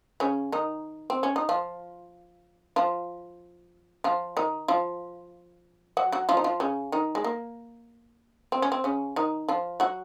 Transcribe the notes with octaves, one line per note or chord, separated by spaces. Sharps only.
C#3 C#4
D#3 D#4
C4
C#4
D#4
F3 F4
F3 F4
F3 F4
D#3 D#4
F3 F4
F#3 F#4
F#3 F#4
F3 F4
D#4
F3 F4
C#3 C#4
D#3 D#4
G#3
A#3
C4
C#4
C4
C#3 C#4
D#3 D#4
F3 F4
F#3 F#4